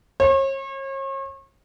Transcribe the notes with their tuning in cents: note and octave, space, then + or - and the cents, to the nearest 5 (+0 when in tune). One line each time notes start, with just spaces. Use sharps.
C#5 -40